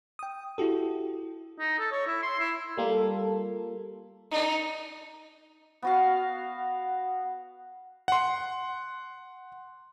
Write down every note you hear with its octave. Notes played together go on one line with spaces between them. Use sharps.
G5 D#6
E4 F#4 G4 A4
D#4
A4
C#5
E4
C6
E4
G3 A#3 F4 A4
D#4
B3 F#4 F5
F#5 C6